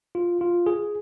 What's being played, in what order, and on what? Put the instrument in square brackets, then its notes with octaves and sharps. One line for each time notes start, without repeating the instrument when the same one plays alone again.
[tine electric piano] F4
F4
G#4